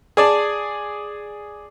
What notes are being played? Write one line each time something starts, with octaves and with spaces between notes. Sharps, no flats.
G#4 D5 A5